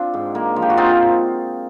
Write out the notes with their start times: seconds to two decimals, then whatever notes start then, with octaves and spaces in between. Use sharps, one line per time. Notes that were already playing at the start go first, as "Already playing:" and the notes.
Already playing: C4 D4 F4
0.14 G#2
0.35 A#3
0.56 F3
0.62 G4
0.70 F#4
0.77 C4 D#4 F4